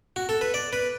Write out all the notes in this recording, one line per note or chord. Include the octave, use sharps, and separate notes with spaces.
F#4
A4
B4
D5
B4